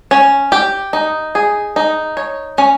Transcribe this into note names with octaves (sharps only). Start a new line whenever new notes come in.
C#4
G4
D#4
G#4
D#4
C#5
C#4